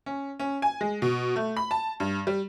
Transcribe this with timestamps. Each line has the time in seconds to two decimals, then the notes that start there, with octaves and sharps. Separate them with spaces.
0.06 C#4
0.40 C#4
0.62 G#5
0.81 G#3
1.02 B2
1.36 A3
1.57 B5
1.71 A5
2.00 G2
2.27 G3